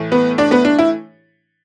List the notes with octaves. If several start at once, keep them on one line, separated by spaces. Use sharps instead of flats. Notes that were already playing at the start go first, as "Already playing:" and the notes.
Already playing: A2 E3 A3
B3 B4
D4 D5
B3 B4
D4
E4